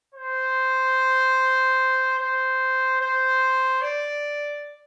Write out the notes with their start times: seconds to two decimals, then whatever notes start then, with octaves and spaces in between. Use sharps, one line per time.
0.14 C5
2.19 C5
3.01 C5
3.81 D5